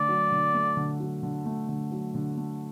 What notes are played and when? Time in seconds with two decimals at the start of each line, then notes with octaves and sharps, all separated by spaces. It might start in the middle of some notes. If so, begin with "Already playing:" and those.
Already playing: D3 A3 D5
0.09 F#3
0.32 D3
0.54 A3
0.77 D3
1.00 F#3
1.23 D3
1.46 A3
1.69 D3
1.92 F#3
2.15 D3
2.37 A3